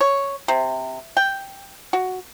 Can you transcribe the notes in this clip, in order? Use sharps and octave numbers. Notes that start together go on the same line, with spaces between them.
C#5
C3
G5
F#4